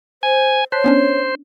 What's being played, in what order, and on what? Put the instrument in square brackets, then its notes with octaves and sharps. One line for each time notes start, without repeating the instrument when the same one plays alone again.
[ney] C5 [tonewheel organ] G#5
[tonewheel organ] C5 [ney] C#5 [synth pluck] A5 F#6 B6
[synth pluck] B3 C#4 D4